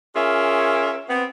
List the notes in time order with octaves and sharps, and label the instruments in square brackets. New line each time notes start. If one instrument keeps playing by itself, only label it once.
[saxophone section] C#4 F4 G#4 A#4 E5
B3 C4